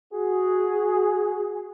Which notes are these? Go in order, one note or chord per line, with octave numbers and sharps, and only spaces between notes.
F#4 G#4